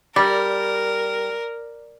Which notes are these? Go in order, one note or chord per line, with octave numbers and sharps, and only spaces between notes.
G3 A#4 D5